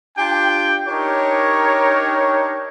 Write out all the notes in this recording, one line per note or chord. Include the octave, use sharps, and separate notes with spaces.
D4 F4 G4 G5
D4 D#4 G4 A#4 C#5